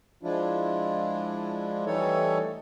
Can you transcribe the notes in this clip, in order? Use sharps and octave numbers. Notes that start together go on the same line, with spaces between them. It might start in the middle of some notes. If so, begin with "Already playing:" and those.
F3 G#3 D4 E4 F4
E3 G3 A3 D#4 A4 C#5